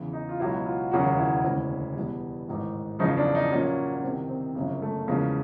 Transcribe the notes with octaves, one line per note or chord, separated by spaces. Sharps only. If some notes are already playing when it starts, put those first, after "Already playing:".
Already playing: E2 C#3 E3
D#4
F4
C#2 B2 F#3 E4
F4
E1 D#2 C#3 F#3 F#4
E4
E1 D2 C#3 E4
E2 B2 G3
A1 G#2 D#3
F#1 E2 C#3 F3 D#4
D4
D#4
A#1 A#2 F#3 C#4
C#4
C2 C3 D#3 C4
C4
G1 F#2 C#3 A#3
A3
E2 C#3 F3 G#3 A#3